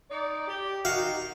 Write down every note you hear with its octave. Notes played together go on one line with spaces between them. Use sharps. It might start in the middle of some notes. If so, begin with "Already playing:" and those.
D#4 D5
G4
D#3 F#4 F5 C#7